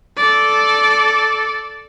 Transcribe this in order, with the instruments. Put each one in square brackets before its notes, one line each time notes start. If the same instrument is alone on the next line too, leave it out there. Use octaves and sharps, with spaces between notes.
[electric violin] A4 D5